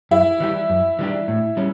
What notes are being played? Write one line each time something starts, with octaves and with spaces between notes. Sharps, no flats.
F#2 E4
E3 G3 D4 G4
F#2
E3 G3 D4 G4
A2
G3 C#4